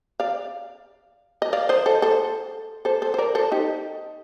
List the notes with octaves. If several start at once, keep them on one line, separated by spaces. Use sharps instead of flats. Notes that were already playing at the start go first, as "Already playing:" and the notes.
D5 F5
D#5
D5 F5
C5 D#5
A4 C5
A4 C5
A4 C5
A4 C5
C5
A#4 D5
A4 C5
D#4 G4